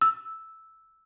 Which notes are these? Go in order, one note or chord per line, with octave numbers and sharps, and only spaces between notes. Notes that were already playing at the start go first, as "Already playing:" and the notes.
E6